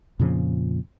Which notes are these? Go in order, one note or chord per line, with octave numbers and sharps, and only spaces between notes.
F2 A#2 C#3 F3